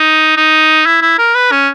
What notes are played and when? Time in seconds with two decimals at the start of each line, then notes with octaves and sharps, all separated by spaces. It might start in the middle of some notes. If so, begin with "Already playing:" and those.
Already playing: D#4
0.37 D#4
0.86 E4
1.02 E4
1.18 A#4
1.35 B4
1.52 C#4